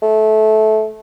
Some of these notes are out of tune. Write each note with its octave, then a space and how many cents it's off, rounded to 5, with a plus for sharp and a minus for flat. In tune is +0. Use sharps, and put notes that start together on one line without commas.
A3 -20